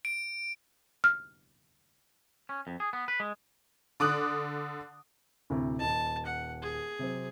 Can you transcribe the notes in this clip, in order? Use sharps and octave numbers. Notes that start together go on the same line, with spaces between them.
D7
F6
C#4
F2
G#4
B3
B4
G#3
D3 D6 D#6 F#6
D2 A2 C3
D#1 D#5 A5
F#5
G#4
C3 F#3 C4